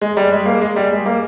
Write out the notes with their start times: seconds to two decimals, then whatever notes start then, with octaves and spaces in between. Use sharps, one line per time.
0.01 G#3
0.17 G3
0.32 G#3
0.46 A#3
0.61 G#3
0.76 G3
0.92 G#3
1.06 A#3